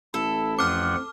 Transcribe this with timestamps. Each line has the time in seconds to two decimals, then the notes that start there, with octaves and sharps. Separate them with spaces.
0.14 A1 E4 A4
0.59 F2 F3 F#5 D6 F6